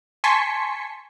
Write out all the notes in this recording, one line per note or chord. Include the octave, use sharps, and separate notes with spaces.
G#5 A5 C6 C#6 B6 C#7